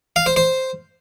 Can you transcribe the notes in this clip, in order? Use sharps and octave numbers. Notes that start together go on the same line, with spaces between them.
F5
C5
C5